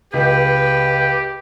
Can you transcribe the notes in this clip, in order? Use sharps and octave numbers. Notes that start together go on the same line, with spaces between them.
C#2 G4 B4